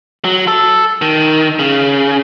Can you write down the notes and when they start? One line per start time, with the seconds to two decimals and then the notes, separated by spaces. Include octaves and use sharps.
0.25 F#3
0.47 A4
1.02 D#3
1.59 C#3